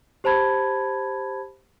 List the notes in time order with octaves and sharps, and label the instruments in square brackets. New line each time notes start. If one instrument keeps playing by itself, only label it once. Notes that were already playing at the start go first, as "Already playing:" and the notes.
[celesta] G4 C5 A5 B5 G#6